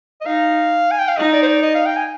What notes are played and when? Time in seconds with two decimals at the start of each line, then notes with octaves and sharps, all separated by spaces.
0.21 D#5
0.26 D#4 F5
0.91 G#5
0.99 G5
1.09 F5
1.17 D#4 D#5
1.33 D5
1.43 C5
1.47 D5
1.62 D#5
1.75 F5
1.86 G5
1.97 G#5